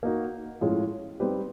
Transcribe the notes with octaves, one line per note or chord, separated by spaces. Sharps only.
A#3 D#4 F#4
A2 F3 G#3 C#4 F4
G3 C4 D#4 G4 B4